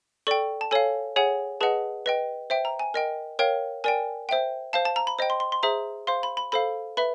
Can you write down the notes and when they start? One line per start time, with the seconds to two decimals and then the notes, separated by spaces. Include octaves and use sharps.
0.27 A4 D5 G5 C#6
0.61 A5
0.71 A4 C#5 F5 G#5
1.16 G#4 C#5 F#5 G#5
1.61 G#4 B4 D#5 F#5 A5
2.06 B4 D#5 G5
2.50 C5 E5 G5
2.65 A#5
2.79 G#5
2.94 A#4 D#5 G5
3.39 A#4 C#5 F5 G5
3.84 A#4 D5 G5 G#5
4.29 C5 E5 G5
4.73 C5 F5 A5
4.85 A5
4.96 A#5
5.07 B5
5.19 C5 D#5 G5
5.30 C6
5.40 C6
5.52 C6
5.63 G#4 C5 E5 A#5
6.07 C5 F5 C6
6.23 B5
6.37 B5
6.52 A4 C5 F5 B5
6.97 B4 E5 B5